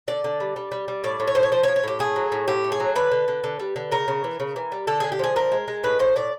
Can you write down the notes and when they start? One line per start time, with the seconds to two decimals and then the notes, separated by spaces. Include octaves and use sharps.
0.08 D3 D5
0.24 D3
0.40 G3
0.56 G3
0.72 G3
0.88 G3
1.04 A2 D5
1.20 A2
1.27 C#5
1.35 A2 C5
1.43 C#5
1.52 F3 C5
1.63 C#5
1.68 F3
1.76 C#5
1.83 A2 G4
1.99 A3 G#4
2.16 F#3
2.32 A2
2.48 A2 G4
2.64 A3
2.72 G#4
2.80 F#3
2.95 D3 B4
3.11 D3
3.28 D3
3.44 D3
3.60 G3
3.76 D3
3.92 C#3 A#4
4.08 C#3
4.24 E3
4.40 C#3
4.56 E3
4.72 G3
4.87 D3 A4
5.00 D3 G#4
5.12 G4
5.19 F3 G#4
5.36 D3 A#4
5.52 G#3
5.68 G#3
5.84 A2 B4
5.99 A2 C5
6.16 A2 D5